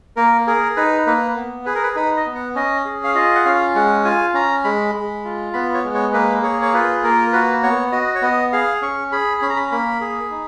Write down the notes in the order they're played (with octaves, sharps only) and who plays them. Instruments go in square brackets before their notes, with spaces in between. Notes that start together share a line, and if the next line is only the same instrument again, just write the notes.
[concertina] A#3 A#4
G#4 A#4
D#4 B4
A#3 B4
B3
G#4 B4
A#4
B4
D#4 B4
D#5
B3
F#5
C#4 D#5
G#4
F5
F4 D#5
F#5
C#4 F5
G#3 F#5
F4 G#5
C#4 A#5
G#3 B5
G#3
F4
B3 B5
C#5
G#3
C#5
A#3 B4
G#4 C#5
C#5
F4 B4
A#3 A#4
F#4 B4
B3 C#5
F#4 D#5
C#5
B3 D#5
G#4 F5
C#4 C#6
G#4 B5
C#4 B5
A#5
B5
A#3 B5
G#4
D#4